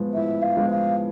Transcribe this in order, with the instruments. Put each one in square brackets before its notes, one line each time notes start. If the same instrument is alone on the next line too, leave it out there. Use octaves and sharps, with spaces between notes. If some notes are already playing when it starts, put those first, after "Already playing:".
Already playing: [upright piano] A2 F3 G#3 B3
[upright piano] A2 [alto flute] E5
[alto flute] F5
[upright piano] F3 G#3 B3
[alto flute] F5